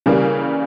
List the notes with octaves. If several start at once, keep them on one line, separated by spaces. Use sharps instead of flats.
C#3 E3 G3 A#3